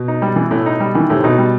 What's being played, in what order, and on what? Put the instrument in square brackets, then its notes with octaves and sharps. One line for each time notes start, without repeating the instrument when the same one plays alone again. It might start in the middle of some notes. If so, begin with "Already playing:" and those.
Already playing: [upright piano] B2
[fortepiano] D#4
G3
E3
A2
D#4
G3
[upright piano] D#3 [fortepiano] E3
[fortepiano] A2 [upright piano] C3
[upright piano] B2 [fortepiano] D#4
[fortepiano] G3